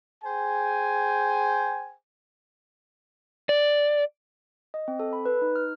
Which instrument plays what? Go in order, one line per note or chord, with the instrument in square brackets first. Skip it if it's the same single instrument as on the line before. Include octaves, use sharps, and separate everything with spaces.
[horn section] G#4 C5 G5 G#5
[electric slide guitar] D5
[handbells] D#5
C4
A4
B5
B4
D#4
F6